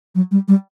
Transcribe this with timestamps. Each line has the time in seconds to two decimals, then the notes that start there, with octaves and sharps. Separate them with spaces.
0.15 F#3
0.31 G3
0.48 G3